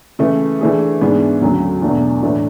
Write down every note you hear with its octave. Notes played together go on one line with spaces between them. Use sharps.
C#3 E3 A3
E3 A3 D4 G#4
G#2 E3 B3 D4 G#4
D2 C#3 F#3
E2 B2 F#3 A3 D4
A2 E3 A3 D4